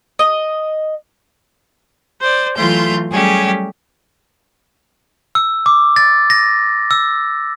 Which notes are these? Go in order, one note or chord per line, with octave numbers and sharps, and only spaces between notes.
D#5
C5 D5
E3 F#3 A3 F4 C6 G6
F#3 G3 A3 C#4 G4 G#4
E6
D6
A6
A#6
E6